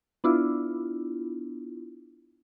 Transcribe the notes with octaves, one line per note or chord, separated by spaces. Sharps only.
B3 D4 E4 F4